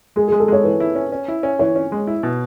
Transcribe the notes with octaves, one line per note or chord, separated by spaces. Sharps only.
G#3 G#4
G#4
G#3
A4
G#3 C#5
E3 B4
E4
C#4
C#4
E4
C#4
E3 C#5
C#4
G#3
E4
B2